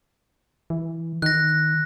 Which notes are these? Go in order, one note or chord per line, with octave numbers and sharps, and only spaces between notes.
E3
D#3 F#6 A#6